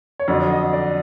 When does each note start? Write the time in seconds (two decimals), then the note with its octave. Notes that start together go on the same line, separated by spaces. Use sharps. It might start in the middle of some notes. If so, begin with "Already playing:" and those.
0.20 C#5
0.28 F2 D3 F#3 D5
0.40 D5
0.50 D#5
0.73 D5